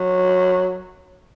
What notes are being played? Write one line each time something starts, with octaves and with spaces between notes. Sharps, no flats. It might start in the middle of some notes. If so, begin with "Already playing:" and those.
Already playing: F#3